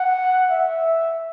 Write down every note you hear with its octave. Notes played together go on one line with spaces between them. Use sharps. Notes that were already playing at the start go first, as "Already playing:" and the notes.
Already playing: F#5
E5